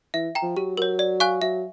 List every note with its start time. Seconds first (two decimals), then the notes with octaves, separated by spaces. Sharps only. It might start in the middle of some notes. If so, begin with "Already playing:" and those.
0.14 E3 E5
0.35 G5 A#5
0.42 F3
0.57 F#3 G4
0.77 F#3 A#4 C#5
0.99 D5
1.20 F5 G#5 C#6 F#6
1.42 F#3 E5